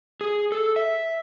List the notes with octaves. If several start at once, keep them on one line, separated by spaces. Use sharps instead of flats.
G#4
A4
E5